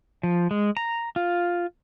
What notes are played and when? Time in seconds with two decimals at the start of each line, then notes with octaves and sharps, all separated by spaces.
0.23 F3
0.51 G#3
0.77 A#5
1.16 F4